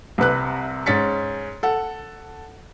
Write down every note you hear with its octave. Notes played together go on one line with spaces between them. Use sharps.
C2 C3 B4 F#6
G#2 C#4 A6 B6 C#7
A4 F#5